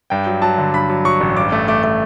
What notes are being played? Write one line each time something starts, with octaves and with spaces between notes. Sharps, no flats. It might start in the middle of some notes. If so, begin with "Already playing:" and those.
G2 G5
F#3
F#3 A5
D3
G2 B5
F#3
F#3 C#6
A1
G2 D6
A3
A3 D6
A3